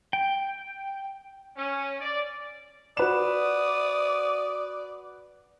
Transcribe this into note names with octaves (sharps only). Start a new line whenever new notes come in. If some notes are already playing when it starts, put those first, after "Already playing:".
G5
C#4
D5
F#4 B4 D5 D#6 E7